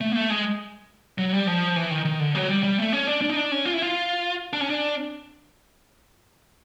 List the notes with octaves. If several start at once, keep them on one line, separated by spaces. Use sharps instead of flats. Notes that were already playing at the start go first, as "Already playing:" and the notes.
A3
A#3
A3
G#3
F#3
G3
F3
E3
D#3
D#3
D3
F#3
G3
G3
A3
C#4
D4
D4
D#4
D4
C#4
F4
E4
F4
D4
C#4
D4